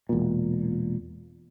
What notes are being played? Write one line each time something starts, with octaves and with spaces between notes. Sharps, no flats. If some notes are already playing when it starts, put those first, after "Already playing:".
E1 A#2